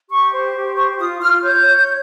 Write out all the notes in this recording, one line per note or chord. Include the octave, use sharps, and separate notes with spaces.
G4 C#6
C5
G4
C5 C#6
F4 D#6
F4 F6
C#5 G6
C#5